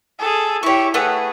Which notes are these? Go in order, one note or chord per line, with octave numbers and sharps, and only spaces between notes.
G#4 A4
E4 G4 C#5 C#6
A3 G#4 B4 F#5